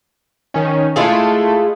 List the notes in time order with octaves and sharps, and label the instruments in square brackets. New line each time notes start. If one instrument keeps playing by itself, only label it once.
[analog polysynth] D#3 C#4
[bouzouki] G#3 F4 G#4 [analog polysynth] A3 E4 A4